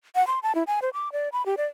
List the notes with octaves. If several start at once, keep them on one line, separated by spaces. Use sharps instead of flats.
F#5
C6
A5
E4
G#5
C5
D6
D5
B5
G4
D5